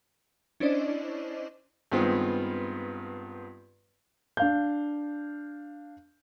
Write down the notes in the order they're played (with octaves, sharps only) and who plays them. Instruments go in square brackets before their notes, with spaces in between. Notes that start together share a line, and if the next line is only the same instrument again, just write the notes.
[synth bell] C#4 D4 E4 C5 D5 D#5
[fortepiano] G2 D#3 G#3 B3 C4 F4
[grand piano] D4 F5 G6